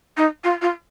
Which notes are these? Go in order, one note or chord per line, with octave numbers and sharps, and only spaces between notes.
D#4
F4
F4